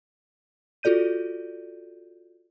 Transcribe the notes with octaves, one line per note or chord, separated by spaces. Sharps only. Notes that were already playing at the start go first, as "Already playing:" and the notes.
F4 F#4 A4 D5 G6 D#7